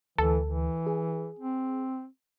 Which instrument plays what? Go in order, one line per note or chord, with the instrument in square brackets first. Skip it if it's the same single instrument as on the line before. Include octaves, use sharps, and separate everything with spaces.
[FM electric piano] D2 [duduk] E3 [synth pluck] A4
[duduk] E3
[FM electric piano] G#4
[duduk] C4